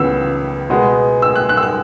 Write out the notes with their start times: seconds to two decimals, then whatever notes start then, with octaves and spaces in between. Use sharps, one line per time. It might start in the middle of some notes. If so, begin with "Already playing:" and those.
Already playing: C#2 C#3 E3 B3 E6
0.70 B2 G#3 B3
1.22 E6
1.36 F#6
1.49 F#6
1.57 E6
1.63 F#6